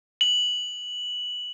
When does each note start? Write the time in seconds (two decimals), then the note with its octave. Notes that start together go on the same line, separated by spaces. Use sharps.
0.21 F#7